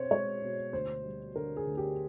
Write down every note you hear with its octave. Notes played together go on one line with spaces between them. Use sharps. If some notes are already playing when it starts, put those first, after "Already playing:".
Already playing: B2 C4 C5 C#5
G#3 C#5
B2
D2 C5
G3
D3 A#4
G#4
D2
G4